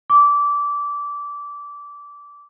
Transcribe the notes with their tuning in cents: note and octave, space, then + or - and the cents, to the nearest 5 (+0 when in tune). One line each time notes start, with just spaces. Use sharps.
D6 -20